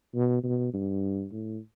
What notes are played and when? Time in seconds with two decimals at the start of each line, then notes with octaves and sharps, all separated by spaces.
0.15 B2
0.43 B2
0.73 G2
1.32 A2